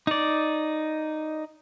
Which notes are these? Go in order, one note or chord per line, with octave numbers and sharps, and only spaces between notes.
D#4 D5